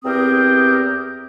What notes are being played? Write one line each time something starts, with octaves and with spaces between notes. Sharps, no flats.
E2 C4 G4 A#4 G5 D#6